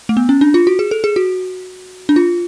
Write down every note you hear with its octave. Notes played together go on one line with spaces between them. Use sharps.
A3
B3
C#4
D4
F4
F#4
G#4
A4
G#4
F#4
D4
F4